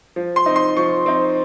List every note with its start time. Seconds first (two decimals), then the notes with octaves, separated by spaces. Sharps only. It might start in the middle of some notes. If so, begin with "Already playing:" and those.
0.16 F3
0.36 C6
0.46 C4 D#4
0.56 C6
0.77 F3 C#6
1.06 C4 D#4